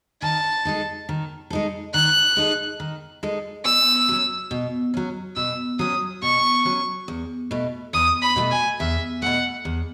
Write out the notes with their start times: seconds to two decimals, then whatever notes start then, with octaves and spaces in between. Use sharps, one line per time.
0.22 D#3 A5
0.65 G#3 D#4 A4
1.09 D#3
1.50 G#3 D#4 A4
1.94 D#3 F#6
2.37 G#3 D#4 A4
2.80 D#3
3.23 G#3 D#4 A4
3.65 B2 E6
4.08 F#3 C#4
4.51 B2
4.94 F#3 C#4
5.36 B2 E6
5.79 F#3 C#4 D#6
6.22 B2 C#6
6.65 F#3 C#4
7.08 E2
7.51 B2 A3
7.93 E2 D#6
8.22 B5
8.36 B2 A3
8.51 G#5
8.80 E2 E5
9.22 B2 A3 F#5
9.65 E2